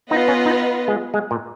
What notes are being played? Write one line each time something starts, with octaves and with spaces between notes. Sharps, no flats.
B3 D#4 F4 B4 D#5
C#4
D#4
G#3
G#3
A#2